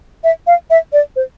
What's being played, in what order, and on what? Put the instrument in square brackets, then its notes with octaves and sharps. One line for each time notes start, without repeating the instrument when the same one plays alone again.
[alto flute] E5
F5
E5
D5
C5